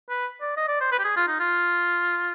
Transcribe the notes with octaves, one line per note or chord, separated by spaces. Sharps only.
B4
D5
D#5
D5
C5
B4
G4
G#4
F4
D#4
F4